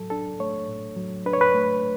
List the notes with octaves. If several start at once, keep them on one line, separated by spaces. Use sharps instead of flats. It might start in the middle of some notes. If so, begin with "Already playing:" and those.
Already playing: A2 F#3 A4
D4 A4
A3 C#5
A2
F#3
D4 B4
C#5
B4
A3